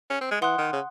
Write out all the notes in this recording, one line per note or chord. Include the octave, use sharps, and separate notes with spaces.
C#4
C4
G#3
E3 F#5 C6 D#6 F#6
D#3
C#3